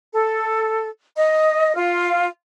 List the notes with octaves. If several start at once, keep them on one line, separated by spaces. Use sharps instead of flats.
A4
D#5
F4